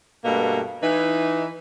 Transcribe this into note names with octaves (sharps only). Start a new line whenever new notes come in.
G2 B2 A3 A#3
E3 D#4